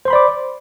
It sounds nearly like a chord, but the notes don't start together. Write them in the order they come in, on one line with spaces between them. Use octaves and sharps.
C5 C6 B5 D5 D6